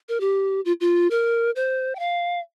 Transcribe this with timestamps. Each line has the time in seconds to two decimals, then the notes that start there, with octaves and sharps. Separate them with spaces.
0.09 A#4
0.20 G4
0.65 F4
0.81 F4
1.11 A#4
1.56 C5
1.95 G5
1.99 F5